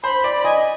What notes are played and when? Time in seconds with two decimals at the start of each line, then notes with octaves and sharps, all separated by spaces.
0.03 C5 B5
0.24 D5
0.37 B5
0.45 D#5 G#5